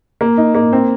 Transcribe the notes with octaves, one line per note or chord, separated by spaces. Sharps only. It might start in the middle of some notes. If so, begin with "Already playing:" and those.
A#3
D#4
A#3
C4